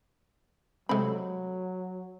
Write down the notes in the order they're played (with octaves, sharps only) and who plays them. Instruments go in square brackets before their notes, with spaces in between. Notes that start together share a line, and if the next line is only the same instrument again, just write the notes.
[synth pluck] C3 G#3 C4 [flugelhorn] F#3 [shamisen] A3 B5